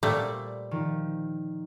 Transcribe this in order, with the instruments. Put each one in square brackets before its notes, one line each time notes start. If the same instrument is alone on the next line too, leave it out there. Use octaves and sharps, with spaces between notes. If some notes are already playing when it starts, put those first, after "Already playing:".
[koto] A#2 G3 A3 [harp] C5 D5
[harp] D#3 F3